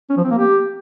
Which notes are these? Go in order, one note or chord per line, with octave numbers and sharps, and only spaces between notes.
C#4
F3
C4
A#3
G4